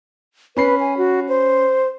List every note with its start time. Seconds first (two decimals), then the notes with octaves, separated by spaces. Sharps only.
0.57 C#4 B4 B5 C7
0.80 G#5
0.97 F#4
1.29 C5